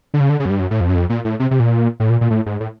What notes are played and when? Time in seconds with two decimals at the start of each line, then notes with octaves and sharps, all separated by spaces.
0.14 D3
0.20 C#3
0.30 D3
0.40 C#3
0.46 F#2
0.50 G2
0.59 F#2
0.71 A2
0.80 F2
0.89 F#2
0.95 F2
1.10 A#2
1.25 A2
1.40 C3
1.51 C3
1.60 A#2
2.00 A2
2.10 A#2
2.21 A#2
2.30 A2
2.46 G#2
2.60 A2